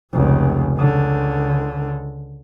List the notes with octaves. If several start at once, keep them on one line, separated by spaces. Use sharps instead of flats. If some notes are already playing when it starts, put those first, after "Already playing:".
F1 C#2
C#2 D3